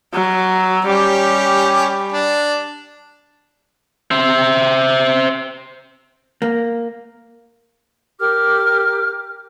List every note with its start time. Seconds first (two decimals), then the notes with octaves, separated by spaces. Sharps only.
0.13 F#3
0.86 G3 C#4 G4
2.12 D4
4.11 C5 E5
6.42 A#3
8.20 G4 A#4 D6 F6